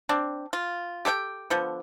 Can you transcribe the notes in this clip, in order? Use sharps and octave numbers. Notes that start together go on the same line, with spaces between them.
C4 D4
F4
G4 A4 C#5 G5
D3 F3 B3